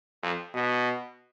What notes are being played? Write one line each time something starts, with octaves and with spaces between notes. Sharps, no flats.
F2
B2